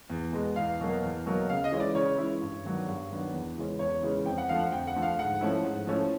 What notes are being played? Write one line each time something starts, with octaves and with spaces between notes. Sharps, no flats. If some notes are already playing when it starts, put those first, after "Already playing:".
E2
B2 G#3 B3
E2 F5
B2 F#3 A#3
E2
B2 F#3 A#3
C#3 F5
D#5
E3 G#3 C#4 E4
D5
C#3 C#5
E3 G#3 C#4 E4
G2
D#3 F#3 B3 D4
G2
D#3 F#3 B3 D4
E2
C#3 E3 G#3 C#4
E2 C#5
C#3 E3 G#3 C#4
F2 G5
F#5
D3 F3 A3 F5
F#5
F2 G5
F#5
D3 F3 A3
F5
G#2 F#5
F3 A3 C#4 E4
G#2
F3 A3 C#4 E4